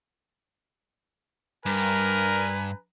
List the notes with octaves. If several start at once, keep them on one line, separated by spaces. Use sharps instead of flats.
G2 A#4 B4 G#5 A#5